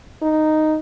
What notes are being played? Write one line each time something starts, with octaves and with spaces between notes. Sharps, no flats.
D#4